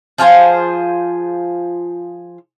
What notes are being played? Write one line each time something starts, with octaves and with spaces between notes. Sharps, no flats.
F3 F4 G#4 C5